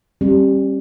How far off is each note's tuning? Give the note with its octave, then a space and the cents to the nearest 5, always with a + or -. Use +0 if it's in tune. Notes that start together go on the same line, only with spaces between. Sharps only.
G3 +5 C#4 -40 G4 +0